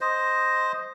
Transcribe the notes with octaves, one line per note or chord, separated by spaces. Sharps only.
C5 D#5